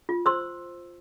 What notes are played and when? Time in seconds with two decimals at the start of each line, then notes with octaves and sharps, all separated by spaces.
0.09 F4
0.26 C5 C6 E6